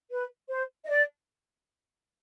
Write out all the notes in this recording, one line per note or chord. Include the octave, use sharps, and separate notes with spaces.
B4
C5
D#5
D5